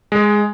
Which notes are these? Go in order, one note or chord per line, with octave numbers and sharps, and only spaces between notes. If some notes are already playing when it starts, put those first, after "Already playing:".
G#3